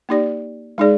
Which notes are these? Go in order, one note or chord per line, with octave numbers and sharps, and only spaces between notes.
A#3 D#4 G4 D5
G#3 D#4 G#4 D5